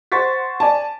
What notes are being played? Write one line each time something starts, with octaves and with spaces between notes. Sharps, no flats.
C5 F#5 C6 C#6 A6 B6
D5 G#5 A5